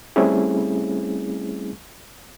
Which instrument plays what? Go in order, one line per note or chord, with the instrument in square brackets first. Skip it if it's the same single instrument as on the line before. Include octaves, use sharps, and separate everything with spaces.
[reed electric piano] G3 A3 C4 C#4 E4 G#4